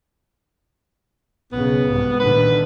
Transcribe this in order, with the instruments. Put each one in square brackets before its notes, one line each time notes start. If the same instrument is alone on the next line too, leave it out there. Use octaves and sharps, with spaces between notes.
[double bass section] B1 C#3 [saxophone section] B3
[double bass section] C2 G#2
[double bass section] A#2 D3 D#3 [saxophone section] B4